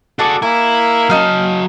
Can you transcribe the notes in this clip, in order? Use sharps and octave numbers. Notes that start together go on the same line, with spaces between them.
D4 F#4 G#4 A4 D5
A#3 E4 G#5
F#3 C#4 D#4 A5 F6